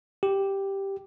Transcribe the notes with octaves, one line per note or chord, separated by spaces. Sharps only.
G4